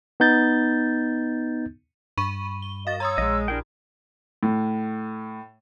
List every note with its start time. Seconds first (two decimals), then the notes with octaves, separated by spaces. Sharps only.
0.20 B3 D#4 G6 A6
2.18 G2 B5 C#6 D#7
2.62 G7
2.87 F#4 A#4 D#5 F5 A6
3.00 C#5 A#5 C6 D#6 E6
3.18 A#1 G#3 D#5
3.48 D4 E4 G4 G#4 A#4 G5
4.43 A2